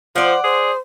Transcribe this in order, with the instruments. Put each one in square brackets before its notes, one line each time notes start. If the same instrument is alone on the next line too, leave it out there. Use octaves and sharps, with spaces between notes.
[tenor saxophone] F3 [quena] C5 [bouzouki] D5 F#5
[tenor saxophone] G#4 [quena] C5